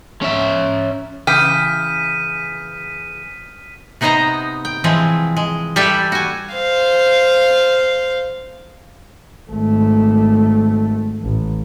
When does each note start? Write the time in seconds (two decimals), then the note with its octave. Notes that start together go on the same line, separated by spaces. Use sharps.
0.22 C#4 E5
1.27 C#3 E3 G5 D#6 F6 G6 B6 D#7
4.01 C3 B3 D#4 C5 D#5 A#5
4.65 G5
4.84 E3 F3 G#3 C4
5.37 G#3
5.76 G3 G4 A4 B4 D5 E5
6.12 F#4 G#5
6.54 C5 F5
9.52 G#1 A3
11.23 A1